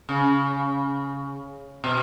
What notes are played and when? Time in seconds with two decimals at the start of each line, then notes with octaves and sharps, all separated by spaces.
0.09 C#3
1.84 B2